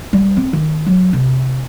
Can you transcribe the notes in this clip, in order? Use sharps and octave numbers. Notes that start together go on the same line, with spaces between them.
G3
C4
D#3
F#3
C3